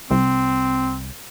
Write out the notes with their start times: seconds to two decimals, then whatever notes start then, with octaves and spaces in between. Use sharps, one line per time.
0.11 C2 C4